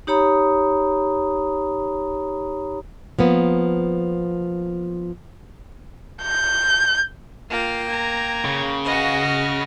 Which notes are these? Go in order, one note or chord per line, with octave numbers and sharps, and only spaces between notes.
D#4 G4 C#5 A#5 B5 D#6
F3 A#3 B3
G6
A#3 F4 F5 G5
A#5 G#6
C#3
F#4 B4 D#5 F5
F6